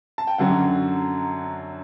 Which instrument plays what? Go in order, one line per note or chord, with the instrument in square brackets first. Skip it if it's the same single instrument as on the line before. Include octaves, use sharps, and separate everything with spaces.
[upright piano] A5
G5
F#2 D3 F#3 F#5